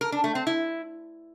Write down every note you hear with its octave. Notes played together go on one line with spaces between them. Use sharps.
A#4
D4
A3
C4
E4